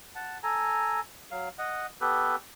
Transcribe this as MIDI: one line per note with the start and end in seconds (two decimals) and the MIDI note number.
0.15 0.38 78
0.15 0.38 81
0.43 1.00 69
0.43 1.00 80
0.43 1.00 82
1.31 1.49 54
1.31 1.49 77
1.58 1.86 75
1.58 1.86 78
2.01 2.36 59
2.01 2.36 67
2.01 2.36 69
2.01 2.36 71